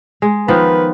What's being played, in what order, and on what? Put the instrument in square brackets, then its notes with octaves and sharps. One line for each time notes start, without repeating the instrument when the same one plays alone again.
[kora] G#3
[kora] D#3 F3 B3 [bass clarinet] B4